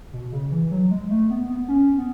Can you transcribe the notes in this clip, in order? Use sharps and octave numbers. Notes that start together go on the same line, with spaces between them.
B2
C#3
E3
F#3
G#3
A3
B3
B3
C#4
B3